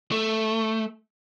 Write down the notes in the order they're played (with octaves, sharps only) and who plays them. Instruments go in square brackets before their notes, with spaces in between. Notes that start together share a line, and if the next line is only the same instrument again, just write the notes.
[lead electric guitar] A3